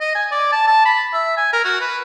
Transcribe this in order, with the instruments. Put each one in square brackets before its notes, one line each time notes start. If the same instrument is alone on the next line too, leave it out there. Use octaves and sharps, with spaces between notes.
[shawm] D#5
G#5
D5
A5
A5
B5
E5
G#5
A#4
F#4
B4